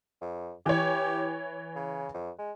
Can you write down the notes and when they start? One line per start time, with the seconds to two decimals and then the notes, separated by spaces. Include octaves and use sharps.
0.21 F2
0.66 E3 G4 C#5
1.76 C#3
2.14 F2
2.39 G#3